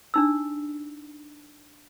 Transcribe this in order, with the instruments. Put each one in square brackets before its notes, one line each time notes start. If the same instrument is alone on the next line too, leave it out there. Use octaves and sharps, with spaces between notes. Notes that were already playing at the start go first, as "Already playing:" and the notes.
[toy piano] D4 D#4 E6